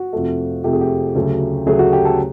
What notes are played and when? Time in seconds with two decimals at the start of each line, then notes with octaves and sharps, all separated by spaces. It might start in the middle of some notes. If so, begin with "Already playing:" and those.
Already playing: F#4
0.13 F2 C3 F3 A3
0.64 F2 C3 F3 A3 G4
0.73 G#4
0.81 G4
1.16 D2 C#3 F#3 A3
1.66 D2 C#3 F#3 A3 G#4
1.79 F#4
1.93 G4
2.05 A4